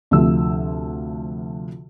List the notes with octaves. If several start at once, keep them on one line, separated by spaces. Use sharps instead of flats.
D2 C3 F3 E6